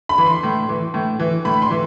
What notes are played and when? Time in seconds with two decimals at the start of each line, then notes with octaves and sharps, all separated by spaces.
0.09 B5
0.18 E3
0.26 C6
0.43 A2
0.69 E3
0.94 A2
1.20 E3
1.45 A2 B5
1.62 C6
1.71 E3